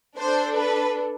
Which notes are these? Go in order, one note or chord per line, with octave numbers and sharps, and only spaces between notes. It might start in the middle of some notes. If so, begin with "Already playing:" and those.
D4 A4 C5
B4